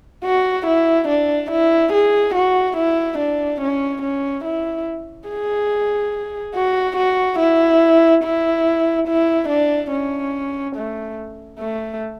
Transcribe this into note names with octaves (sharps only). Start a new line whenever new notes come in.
F#4
E4
D4
E4
G#4
F#4
E4
D4
C#4
C#4
E4
G#4
F#4
F#4
E4
E4
E4
D4
C#4
A3
A3